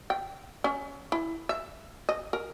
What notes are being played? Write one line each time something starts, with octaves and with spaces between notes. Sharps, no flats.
G5
C#4
E4
E5
D#5
A#4